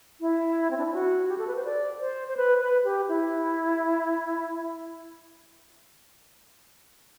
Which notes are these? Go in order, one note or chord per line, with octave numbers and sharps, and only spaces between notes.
E4
C4
D4
E4
F#4
G4
A4
B4
C5
D5
C5
C5
B4
B4
G4
E4